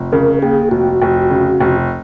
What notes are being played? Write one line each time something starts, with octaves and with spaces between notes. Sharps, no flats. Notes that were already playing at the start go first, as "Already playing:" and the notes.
Already playing: F1
C#3 A#4
D#2 G#4
F1 F#4
F1
C#3
F1